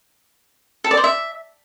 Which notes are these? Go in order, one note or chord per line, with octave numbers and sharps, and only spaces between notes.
A4
D5
C5
E5